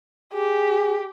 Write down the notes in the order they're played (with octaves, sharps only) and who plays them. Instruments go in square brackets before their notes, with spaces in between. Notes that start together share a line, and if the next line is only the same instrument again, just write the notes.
[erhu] G4 [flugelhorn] G#4